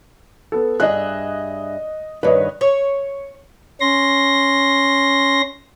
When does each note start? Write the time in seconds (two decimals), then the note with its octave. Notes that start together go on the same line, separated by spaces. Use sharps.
0.52 B3 A4
0.80 G2 G#4 D#5 E5 F#6
2.23 G2 D#3 B4 C#5 D#5
2.61 C#5
3.81 C#4 C6 A#6